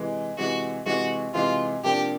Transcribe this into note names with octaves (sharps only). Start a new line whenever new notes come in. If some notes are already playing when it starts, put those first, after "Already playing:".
Already playing: C3 E3 G#3
C3 E3 G#3 F#4
C3 E3 G#3 F#4
C3 E3 G#3 F4
C3 F3 A#3 D4 G4